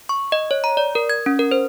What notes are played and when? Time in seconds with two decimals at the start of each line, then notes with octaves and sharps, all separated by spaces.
0.09 C#6
0.32 D#5
0.51 C#5
0.64 A#5
0.77 D5
0.95 A#4
1.10 G#6
1.26 C#4
1.39 A#4
1.51 C5